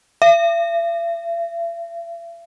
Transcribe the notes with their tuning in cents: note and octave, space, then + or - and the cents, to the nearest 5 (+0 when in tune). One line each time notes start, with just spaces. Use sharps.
E5 +45